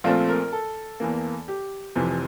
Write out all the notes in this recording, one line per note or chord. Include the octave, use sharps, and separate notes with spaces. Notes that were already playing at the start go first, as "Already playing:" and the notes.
A#1 A#2 A3 C4 F4
A#4
A4
E2 E3 A#3
G4
F1 F2 C3 E3